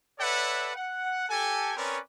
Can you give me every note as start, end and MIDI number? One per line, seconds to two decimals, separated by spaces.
0.19 0.71 69
0.19 0.71 71
0.19 0.71 73
0.19 0.71 74
0.19 0.71 76
0.19 0.71 78
0.75 1.29 78
1.29 1.76 67
1.29 1.76 69
1.29 1.76 80
1.76 1.98 60
1.76 1.98 61
1.76 1.98 70
1.76 1.98 71
1.76 1.98 73
1.76 1.98 74